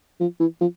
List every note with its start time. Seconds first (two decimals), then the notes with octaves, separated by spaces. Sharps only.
0.20 F3
0.40 E3
0.61 F3